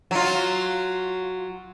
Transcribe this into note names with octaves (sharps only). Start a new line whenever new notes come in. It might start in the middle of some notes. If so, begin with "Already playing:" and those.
F#3 F4